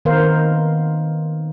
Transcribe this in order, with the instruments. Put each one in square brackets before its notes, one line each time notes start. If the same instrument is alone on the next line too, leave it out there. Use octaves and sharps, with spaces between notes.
[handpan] D#3 B3 A#4 C5 F5